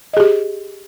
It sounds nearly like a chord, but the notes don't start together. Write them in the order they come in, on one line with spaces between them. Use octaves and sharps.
D#5 G#4 G4